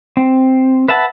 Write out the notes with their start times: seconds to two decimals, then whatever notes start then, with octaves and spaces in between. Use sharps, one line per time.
0.17 C4
0.88 B4 E5 F#5 A5